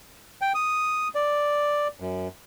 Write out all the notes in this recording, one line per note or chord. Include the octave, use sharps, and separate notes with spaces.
G5
D#6
D5
F#2